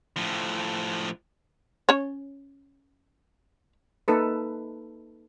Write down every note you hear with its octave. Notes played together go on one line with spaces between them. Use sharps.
A2 F3
C#4 C#5
A#3 D#4 A4 B4